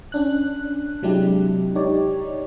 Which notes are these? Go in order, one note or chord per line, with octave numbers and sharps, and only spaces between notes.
C#4 D4 F#6
C3 F#3 G#3 D4 E4 G4
D#4 G4 C#5 D5